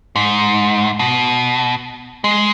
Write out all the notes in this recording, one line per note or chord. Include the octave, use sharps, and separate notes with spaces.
G#2
B2
G#3